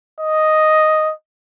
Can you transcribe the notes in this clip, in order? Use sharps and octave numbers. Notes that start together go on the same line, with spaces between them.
D#5